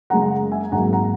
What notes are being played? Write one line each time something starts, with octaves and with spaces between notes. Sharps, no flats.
F#1 F#2 C#3 G#3 F#5 A#5
E5 G#5
G#1 G#2 F#3 A#3 F#5 A#5
F#5 A#5